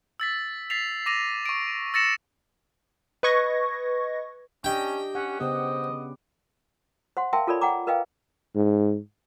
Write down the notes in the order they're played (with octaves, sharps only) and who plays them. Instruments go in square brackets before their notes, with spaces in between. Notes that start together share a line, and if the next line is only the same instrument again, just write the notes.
[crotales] E6 A6 B6
A6 B6 C7 F7
D6 A#6 D#7 F7
C#6 D7
E6 A6 A#6 C#7 E7
[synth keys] B4 D#5 C#6 G#6 A#6
[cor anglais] C#4 [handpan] D4 D#5 [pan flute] G4 [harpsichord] G5
[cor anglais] C#4 [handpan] F#5
[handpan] C#3 B3 G4 [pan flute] C5 [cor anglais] D#5
[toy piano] C5 F#5 C6
A#4 E5 F5 G5 A5 C6
F4 A4 A#4 C#5 D5 B5
F#5 G5 A#5 D6
A#4 B4 D#5 F5 G5
[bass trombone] G#2